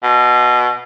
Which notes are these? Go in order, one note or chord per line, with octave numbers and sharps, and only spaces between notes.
B2